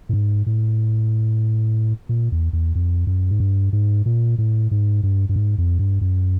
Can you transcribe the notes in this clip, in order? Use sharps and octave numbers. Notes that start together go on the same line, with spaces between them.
A2
G#2
A2
A#2
E2
E2
F2
F#2
G#2
G2
G#2
A#2
A2
G#2
G2
G2
G#2
F2
G2
F#2